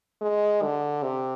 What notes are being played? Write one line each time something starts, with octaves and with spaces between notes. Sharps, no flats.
G#3
D3
C3